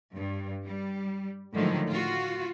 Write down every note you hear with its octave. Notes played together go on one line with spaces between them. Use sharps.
G2
G3
A2 D3 D#3 F3 F#3 G#3
F4 F#4